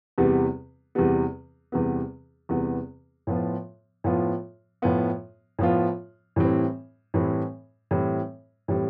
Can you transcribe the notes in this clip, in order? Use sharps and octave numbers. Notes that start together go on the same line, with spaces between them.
E2 C3 G3 B3
E2 C3 G3 B3
E2 C3 G3 B3
E2 C3 G3 B3
A2 F3 B3 F4
A2 F3 B3 F4
A2 F3 B3 F4
A2 F3 B3 F4
A2 E3 G3 C4
A2 E3 G3 C4
A2 E3 G3 C4
A2 E3 G3 C4